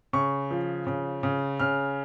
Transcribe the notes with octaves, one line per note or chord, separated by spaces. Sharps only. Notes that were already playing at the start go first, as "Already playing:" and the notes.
C#3 C#6
F3
C#3
C#3
C#3 F6